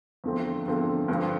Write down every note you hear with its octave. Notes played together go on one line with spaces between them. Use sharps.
E2 D3 F3 A3 C4
E2 D3 F3 A3 C4
G2 D3 F3 C4